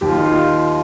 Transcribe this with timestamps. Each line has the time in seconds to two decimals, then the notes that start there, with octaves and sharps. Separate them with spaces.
0.01 D#2 G4
0.09 F4
0.17 D#4
0.25 F4